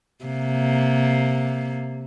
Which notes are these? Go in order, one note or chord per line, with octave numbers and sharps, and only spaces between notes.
C3 A#3